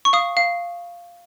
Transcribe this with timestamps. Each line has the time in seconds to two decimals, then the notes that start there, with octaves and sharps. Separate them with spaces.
0.05 C#6
0.13 F5 D#6
0.37 F5